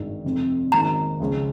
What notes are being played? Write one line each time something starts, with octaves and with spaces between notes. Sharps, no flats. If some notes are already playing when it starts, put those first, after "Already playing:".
Already playing: G#1 G2 D#3 G#3
F1 F2 C3
G#1 G#2 D#3 A#3 C#4 A#5
C#2 C#3 F3 G#3 C#4